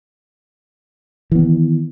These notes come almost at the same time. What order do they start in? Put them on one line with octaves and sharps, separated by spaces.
E3 B3 D#3